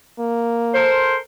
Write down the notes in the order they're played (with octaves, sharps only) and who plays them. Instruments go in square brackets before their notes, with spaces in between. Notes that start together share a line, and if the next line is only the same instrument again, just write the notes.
[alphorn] A#3
[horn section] A4 A#4 C5